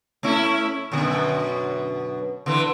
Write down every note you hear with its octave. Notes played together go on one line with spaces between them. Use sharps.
A3 C#4 E4
F#2 B2 D3
D3 E3